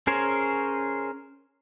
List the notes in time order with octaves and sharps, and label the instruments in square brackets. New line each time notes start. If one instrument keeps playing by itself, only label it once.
[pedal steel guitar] C#4 G#4 A#4 C5 C#5